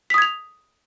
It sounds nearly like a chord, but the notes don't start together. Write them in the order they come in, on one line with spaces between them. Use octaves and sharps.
B6 D#6 G#6 F7